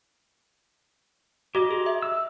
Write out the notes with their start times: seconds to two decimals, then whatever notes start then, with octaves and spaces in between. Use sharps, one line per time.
1.55 F#4 G4 D#5 D6
1.71 G#4
1.86 E5
2.03 E6